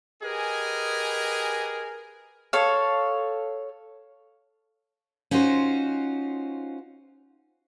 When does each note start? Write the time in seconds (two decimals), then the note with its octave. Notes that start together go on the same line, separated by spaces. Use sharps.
0.22 G4 G#4 A#4 B4 D#5 G#5
2.53 A4 C#5 F5
5.31 C#4 D#4 F4 F#4 C5